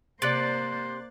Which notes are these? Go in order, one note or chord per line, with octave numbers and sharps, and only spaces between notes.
C3 A#3 C5 D5 F#6 A6